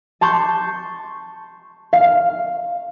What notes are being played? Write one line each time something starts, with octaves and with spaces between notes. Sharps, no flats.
A5 C6 C#6 G6
F5